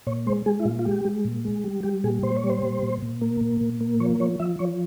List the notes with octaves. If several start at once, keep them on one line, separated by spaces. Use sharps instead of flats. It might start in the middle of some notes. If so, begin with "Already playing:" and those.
A#2 C#5
G#3 C5
G#3 G#4
E4
A#2 F4
F4
G#3 G4
G#3
A#2
G#3
G3
G3 G4
A#2 G#4
A#2 C5
C#5
G3
C5
A#2
A#2
A#2
A#3
A#2
A#2
A#3
F3 C#5
F3 C#5
F3 E5
F3 C#5